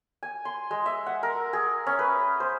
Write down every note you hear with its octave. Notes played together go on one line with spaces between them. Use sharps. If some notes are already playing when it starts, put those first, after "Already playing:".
G#5
C6
G#3
E5
F#5
A#4
G#4
C#4
B4
C5